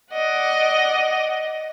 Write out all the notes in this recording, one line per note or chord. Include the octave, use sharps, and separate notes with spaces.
D5 D#5 F#5